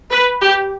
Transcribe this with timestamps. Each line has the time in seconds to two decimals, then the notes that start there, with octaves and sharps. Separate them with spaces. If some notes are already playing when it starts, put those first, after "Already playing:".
0.11 B4
0.42 G4